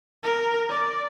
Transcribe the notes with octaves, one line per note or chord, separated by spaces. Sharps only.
A#4
D5